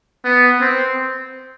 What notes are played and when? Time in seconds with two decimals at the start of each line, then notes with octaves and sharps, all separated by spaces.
0.25 B3
0.61 C4